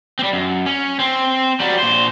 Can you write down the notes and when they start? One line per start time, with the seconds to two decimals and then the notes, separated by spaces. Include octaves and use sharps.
0.19 G3 C4
0.33 F#2
0.66 C#4
0.99 C4
1.60 F#3 G3
1.79 A#2 C5